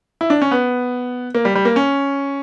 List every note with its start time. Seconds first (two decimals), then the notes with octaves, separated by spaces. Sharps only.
0.21 E4
0.30 D4
0.42 C#4
0.51 B3
1.35 A#3
1.45 G3
1.55 G3
1.65 A#3
1.76 C#4